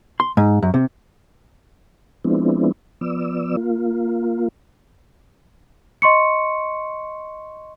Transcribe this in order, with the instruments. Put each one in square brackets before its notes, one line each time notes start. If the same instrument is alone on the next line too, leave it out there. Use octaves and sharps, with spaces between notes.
[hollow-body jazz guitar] C6
G#2
F#2
C3
[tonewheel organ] F3 G#3 B3 C4 D4 E4
F3 B3 D5 E6
A#3 F4
[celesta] D#5 C6 C#6 C#7